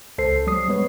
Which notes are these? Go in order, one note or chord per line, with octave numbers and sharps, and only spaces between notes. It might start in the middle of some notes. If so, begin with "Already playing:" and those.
C#2 A4 C5 C7
F#3 G3 D#6 C7
G#3 B3 B4 C#5